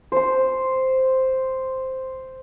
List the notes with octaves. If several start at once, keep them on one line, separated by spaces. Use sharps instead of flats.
C5 C6